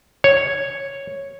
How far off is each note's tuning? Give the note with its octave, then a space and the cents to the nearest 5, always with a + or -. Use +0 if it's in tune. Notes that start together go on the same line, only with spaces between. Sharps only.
C#5 -5